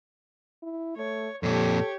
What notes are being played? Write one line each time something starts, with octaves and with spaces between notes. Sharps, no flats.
E4
A3 C#5
F2 A#2 G4 A4 C#5